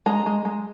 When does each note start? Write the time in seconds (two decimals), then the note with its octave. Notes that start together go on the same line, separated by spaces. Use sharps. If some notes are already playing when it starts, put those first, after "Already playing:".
0.06 G#3 A#5
0.26 G#3
0.45 G#3